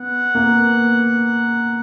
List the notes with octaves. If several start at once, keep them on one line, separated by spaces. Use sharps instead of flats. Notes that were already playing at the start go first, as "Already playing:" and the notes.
Already playing: B3 F#5
A#3